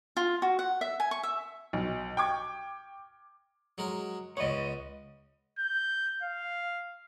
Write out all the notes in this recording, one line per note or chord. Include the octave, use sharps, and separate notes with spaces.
F4
F#4
F#5
E5
G#5
C#6
E5
B1
G5 C#6 D6 G#6
F#3 G#3 A#4
C#2 B3 C#5 D#5
G6
F5